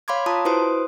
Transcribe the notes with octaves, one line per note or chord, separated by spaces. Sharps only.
C#5 F5 B5 C6 D6 G#6
F4 A5 A#5 D#6
E4 F#4 B4 C5 C6 D#6